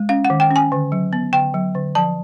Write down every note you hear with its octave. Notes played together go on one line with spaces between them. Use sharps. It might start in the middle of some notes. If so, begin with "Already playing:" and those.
Already playing: G#3
C#4 F5
F#5
D#3
G5
C#4
G#5
D3
F#3
B3
D3 G5
F#3
D3
F3 A5